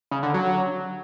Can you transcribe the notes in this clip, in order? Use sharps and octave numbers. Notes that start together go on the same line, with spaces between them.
C#3
D3
F#3